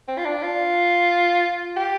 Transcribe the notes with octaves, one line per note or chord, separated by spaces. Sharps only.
C4
F4
D4
F4
G4